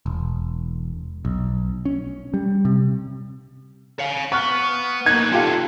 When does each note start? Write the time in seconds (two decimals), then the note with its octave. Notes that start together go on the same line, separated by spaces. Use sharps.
0.06 E1
1.25 B1
1.85 C#4
2.34 G3
2.65 C3
3.99 C#5 F5
4.32 B3 C#6 F6 F#6
5.06 A#3 B3 D#4 F#6 G#6
5.32 D#3 F4 G4 A4 F5